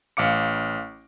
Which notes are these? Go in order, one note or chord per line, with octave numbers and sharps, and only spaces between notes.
A1 F5 D6 C#7